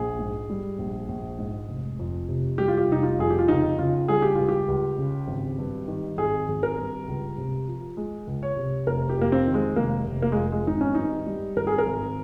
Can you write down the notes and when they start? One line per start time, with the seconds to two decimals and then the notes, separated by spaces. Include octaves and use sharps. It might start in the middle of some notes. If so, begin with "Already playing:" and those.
Already playing: A#1 G#4
0.19 G#2
0.50 G3
0.79 A#1
1.09 A#1
1.39 G#2
1.69 F1
1.99 F2
2.28 C3
2.58 G3 G4
2.68 F4
2.78 G4
2.89 F1 D#4
3.03 F4
3.19 F2 G#4
3.30 G4
3.39 F4
3.48 C#2 D#4
3.79 C#3 F4
4.08 G3 G#4
4.22 G4
4.35 C#2 F4
4.48 G4
4.68 C#2
4.98 C#3
5.28 G#1
5.58 G2
5.88 D#3
6.17 G#1 G#4
6.48 G#1
6.63 A#4
6.78 G2
7.08 C#2
7.38 C3
7.68 F3
7.97 G#3
8.27 C#2
8.43 C#5
8.57 C3
8.87 F1 A#4
9.10 G4
9.17 F2 A#3
9.32 C4
9.47 D#3
9.54 G#3
9.76 F1 A#3
10.07 F1
10.22 A#3
10.32 F2 G#3
10.52 G#3
10.67 G#1 D#4
10.81 C#4
10.95 G2 D#4
11.27 G3
11.56 G#1 A#4
11.67 G#4
11.78 A#4
11.87 G#1